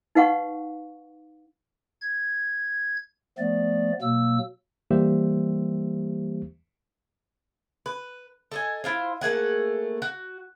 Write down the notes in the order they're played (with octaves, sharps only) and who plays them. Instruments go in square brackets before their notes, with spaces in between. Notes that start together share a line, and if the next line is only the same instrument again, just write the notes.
[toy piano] D#4 B4 F5 F#5 C#6
[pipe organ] G#6
F3 A3 B3 D5
B2 F#3 A#3 E6
[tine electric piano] E3 G3 A#3 G4 C5 E5
[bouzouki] B4
A4 D#5 G#5
E4 F4 C5
A3 A#3 G#4 F#5
F#4